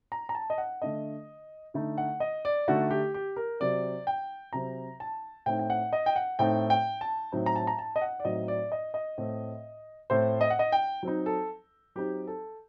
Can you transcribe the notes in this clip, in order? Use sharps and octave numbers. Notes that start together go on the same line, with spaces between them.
A#5
A#5
A5
D#5
F#5
D3 A3 D4 D#5
D3 A3 D#4
F#5
D#5
D5
D3 A3 D#4 F#4
G4
G4
A#4
C3 F#3 C4 D5
G5
C3 F#3 C4 A#5
A5
A2 A3 C4 D#4 G5
G5
F#5
D#5
G5
F#5
A2 A3 C4 D#4 G5
G5
A5
A2 F#3 C4 D#4
A#5
A5
A#5
A5
D#5
F#5
D5
A2 F#3 C4 D#4 D#5
D5
D#5
D#5
A2 A3 C4
A2 A3 C4 C5
D#5
F#5
D#5
G5
F#3 C4 D#4
A4
F#3 C4 D#4 G4
A4